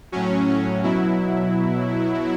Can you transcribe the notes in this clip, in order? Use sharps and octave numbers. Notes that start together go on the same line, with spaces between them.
A2 F#3 C#4
C#4
B2 F#3 E4